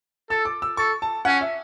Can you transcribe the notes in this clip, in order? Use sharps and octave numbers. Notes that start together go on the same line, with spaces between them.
A4 E6
D6
E6
A4 C#6
A5
C#4 F#5
E5